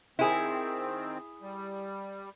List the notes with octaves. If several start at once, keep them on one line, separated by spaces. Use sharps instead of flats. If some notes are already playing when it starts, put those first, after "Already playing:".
D#3 C4 E4 G#4
G3